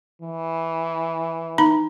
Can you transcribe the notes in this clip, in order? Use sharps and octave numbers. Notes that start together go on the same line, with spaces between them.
E3
D#4 A#5 B5